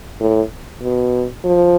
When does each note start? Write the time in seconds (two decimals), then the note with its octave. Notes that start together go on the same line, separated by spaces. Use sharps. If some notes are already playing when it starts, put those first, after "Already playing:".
0.20 A2
0.82 B2
1.45 F3